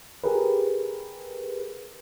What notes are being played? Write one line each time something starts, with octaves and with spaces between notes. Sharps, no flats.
G4 G#4 A#4 B4